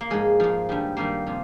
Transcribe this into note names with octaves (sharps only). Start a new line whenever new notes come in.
A#3
G#2 F3 G#3
G#2 F3
G2 D#3 G3
G2 D#3 G3 A#3
C3 F3